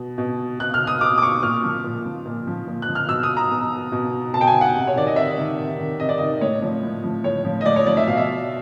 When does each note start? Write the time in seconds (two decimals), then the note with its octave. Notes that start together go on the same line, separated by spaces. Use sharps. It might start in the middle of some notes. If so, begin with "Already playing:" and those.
Already playing: B2
0.18 B2
0.59 B2 F#6
0.74 F6
0.87 D#6
1.01 B2 D6
1.18 D6
1.22 C#6
1.43 A#2 F6
1.63 F3
1.84 A#2
2.05 F3
2.26 A#2
2.47 F3
2.68 A#2
2.82 F#6
2.88 F3
2.95 F6
3.09 B2 E6
3.23 D#6
3.37 A#5
3.50 B2
3.92 B2
4.33 B2 A5
4.41 G5
4.47 G#5
4.61 F#5
4.75 C3
4.87 C#5
4.96 D#3 D5
5.07 D#5
5.16 C3 E5
5.38 D#3
5.58 C3
5.79 D#3
5.99 C3 D#5
6.09 D5
6.18 D#3 D#5
6.41 A2 C#5
6.62 F3
6.83 A2
7.04 F3
7.24 A2 C#5
7.45 F3
7.61 D#5
7.66 A2 D5
7.76 C#5
7.87 F3 D5
7.97 E5
8.07 B2 F5
8.17 E5